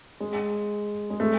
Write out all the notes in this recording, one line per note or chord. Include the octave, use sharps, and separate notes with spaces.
G#3
G#3
A3